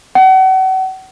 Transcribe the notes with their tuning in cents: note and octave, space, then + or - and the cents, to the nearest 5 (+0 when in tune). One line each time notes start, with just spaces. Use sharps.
F#5 +35